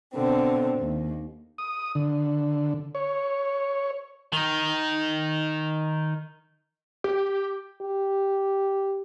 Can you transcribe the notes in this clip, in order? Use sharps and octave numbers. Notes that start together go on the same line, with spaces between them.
B2 D3 C4
D#2
D#6
D3
C#5
D#3 D#4
G4
G4